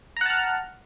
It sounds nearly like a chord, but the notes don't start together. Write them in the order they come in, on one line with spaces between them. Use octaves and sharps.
A#5 F#5 A5 F6